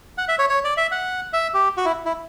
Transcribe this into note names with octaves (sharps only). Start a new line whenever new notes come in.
F#5
E5
C#5
C#5
D5
E5
F#5
E5
G4
F#4
E4
E4